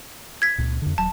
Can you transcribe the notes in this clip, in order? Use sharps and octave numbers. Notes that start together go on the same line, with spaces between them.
G#6 B6
C#2 A#2
F2 D3
D#1 F#3 A5